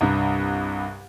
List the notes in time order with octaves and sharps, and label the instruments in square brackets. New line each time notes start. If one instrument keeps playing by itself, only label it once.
[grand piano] C2 G2